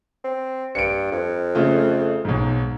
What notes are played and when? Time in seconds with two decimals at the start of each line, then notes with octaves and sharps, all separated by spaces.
0.24 C4
0.75 G2 C#7 D7
1.12 F2
1.55 C#3 A3 F4
2.25 B1 G#2